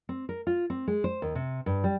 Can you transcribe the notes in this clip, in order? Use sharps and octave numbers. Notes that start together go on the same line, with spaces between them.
C4
A#4
F4
C4
G#3
C5
D#2
C3
G2
G3